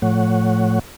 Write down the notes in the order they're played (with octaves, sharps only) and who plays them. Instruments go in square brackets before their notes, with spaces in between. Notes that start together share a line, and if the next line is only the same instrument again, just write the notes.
[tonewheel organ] A2 F3 A3 C#5 F#5